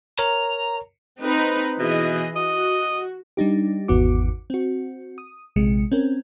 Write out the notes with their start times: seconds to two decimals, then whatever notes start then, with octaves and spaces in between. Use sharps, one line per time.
0.19 A#4 C#5 A#5
1.21 C4 D#4 B4
1.79 B2 E3 G#4 D#5
2.36 F#4 D#5
3.37 G3 D4 D#4 G4
3.88 G#1 E2 B3 F#4 D6
4.50 C4 F#4
5.18 D#6
5.56 A#1 C3 G#3 C#7
5.92 C4 C#4 A#4